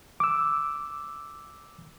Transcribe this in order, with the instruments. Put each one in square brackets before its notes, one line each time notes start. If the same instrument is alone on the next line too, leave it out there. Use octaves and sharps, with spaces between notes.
[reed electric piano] D6 E6